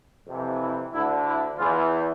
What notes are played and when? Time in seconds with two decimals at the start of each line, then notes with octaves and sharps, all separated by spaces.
0.27 F2 C3 E3
0.60 E4
0.92 D2 D3 E4
1.26 E4
1.57 E2 E3 F4